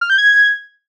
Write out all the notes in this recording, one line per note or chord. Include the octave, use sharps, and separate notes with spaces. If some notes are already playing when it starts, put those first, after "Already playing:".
F6
G6
G#6